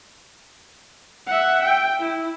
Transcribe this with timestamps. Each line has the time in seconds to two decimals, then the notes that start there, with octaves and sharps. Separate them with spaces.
1.27 E5 F#5
1.63 G5
2.00 E4